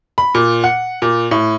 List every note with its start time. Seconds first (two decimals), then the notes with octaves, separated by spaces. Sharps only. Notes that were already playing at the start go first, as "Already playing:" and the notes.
0.18 B5
0.35 A#2
0.64 F#5
1.02 A#2
1.31 A2